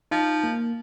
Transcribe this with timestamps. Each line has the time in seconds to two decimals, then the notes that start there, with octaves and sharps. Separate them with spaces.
0.11 F3 D#4
0.44 A#3